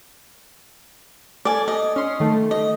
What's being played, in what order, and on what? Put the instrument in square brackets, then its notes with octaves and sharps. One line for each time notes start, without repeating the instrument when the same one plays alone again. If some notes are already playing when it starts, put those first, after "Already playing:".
[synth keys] A4 [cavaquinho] D5 G#5
[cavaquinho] D#5
[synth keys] C#4 C6
D#3 A3
[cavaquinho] D#5